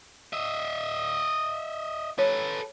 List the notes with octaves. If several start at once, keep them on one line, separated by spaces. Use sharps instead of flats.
D#5 E5
A4 B4 C#5